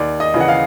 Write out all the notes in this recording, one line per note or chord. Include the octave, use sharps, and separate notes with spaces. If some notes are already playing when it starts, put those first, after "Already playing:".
Already playing: D#2 D5
D#5
C#3 E3
F#5
F5